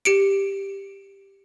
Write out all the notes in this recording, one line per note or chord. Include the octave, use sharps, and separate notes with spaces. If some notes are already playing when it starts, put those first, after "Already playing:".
G4 C#7 D7